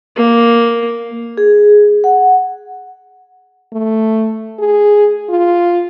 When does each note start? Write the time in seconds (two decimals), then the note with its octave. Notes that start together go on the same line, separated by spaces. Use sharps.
0.16 A#3
1.38 G#4
2.04 F#5
3.73 A3
4.59 G#4
5.30 F4